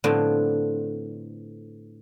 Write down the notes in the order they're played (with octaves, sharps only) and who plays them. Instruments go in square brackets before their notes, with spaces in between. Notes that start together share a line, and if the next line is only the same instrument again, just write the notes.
[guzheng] A2 D3 F3 B3 C4 D4